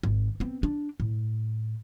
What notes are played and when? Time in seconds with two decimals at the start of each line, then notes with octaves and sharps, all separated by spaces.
0.03 G#1
0.40 B3 C4
0.63 D4
1.00 A2